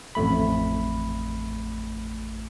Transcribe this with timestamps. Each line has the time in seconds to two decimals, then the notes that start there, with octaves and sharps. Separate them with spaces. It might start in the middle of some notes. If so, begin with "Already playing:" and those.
0.15 A1 F2 A3 B5